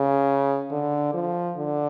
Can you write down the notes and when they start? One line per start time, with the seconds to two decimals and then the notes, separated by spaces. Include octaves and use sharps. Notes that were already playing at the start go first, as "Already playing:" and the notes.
Already playing: C#3
0.72 D3
1.14 F3
1.57 D3